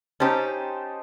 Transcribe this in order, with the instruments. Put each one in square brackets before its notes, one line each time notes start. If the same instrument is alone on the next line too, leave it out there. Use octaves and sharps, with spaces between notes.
[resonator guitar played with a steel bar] C#4 G4 [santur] D#4 C5 A5